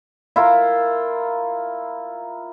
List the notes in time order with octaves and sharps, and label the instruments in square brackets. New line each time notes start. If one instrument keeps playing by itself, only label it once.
[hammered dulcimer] E4 F4 A#4